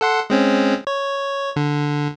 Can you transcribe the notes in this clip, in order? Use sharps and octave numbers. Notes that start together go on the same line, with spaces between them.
A4 F#5 C6
G#3 C4 C#4
C#5
D3